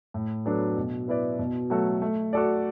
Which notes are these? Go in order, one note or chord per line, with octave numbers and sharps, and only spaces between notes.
A2
F#3 B3 D4 A4
B2
B3 E4 B4 D5
B2
F#3 A3 F#4 A4
A3
F#4 A4 D5